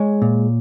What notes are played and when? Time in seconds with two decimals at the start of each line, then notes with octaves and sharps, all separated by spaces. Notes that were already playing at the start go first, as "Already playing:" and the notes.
Already playing: G#3 C#5
0.22 A#2